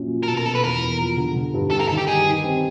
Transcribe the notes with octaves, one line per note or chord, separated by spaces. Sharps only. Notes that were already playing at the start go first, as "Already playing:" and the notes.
Already playing: F#2 A#2 F3 C#4
F3
A#4
B2 A4
A#4
B2 A4
B4
E2 A#4
E2
F3
D3
D3
G2
G3 A4
A#4
D#3 A4
G4
G3 G#4
D#3
C4